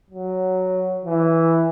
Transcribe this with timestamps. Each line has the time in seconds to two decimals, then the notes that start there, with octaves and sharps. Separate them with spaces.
0.10 F#3
1.05 E3